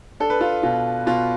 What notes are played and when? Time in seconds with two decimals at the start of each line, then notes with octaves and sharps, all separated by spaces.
0.20 D4 A4
0.30 B4
0.40 F4 A4
0.63 B2 F4
1.06 B2 F4